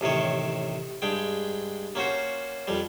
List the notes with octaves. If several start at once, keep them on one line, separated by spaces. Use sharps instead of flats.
A1 C3 D#3 C#5
G2 G#3 G5
A#3 C#4 F#4 C5
F2 G3